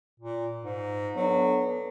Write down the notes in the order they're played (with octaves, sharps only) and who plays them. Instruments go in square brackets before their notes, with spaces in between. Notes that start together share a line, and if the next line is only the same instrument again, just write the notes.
[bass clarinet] A#2
G#2
[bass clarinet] F#3 [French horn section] B3 D4 A4